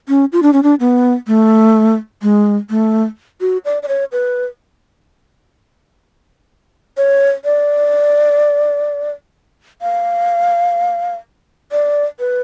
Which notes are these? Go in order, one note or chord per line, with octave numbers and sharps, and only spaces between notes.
C#4
F4
D4
C#4
D4
B3
A3
G#3
A3
F#4
D5
D5
C#5
B4
C#5
D5
F5
D5
B4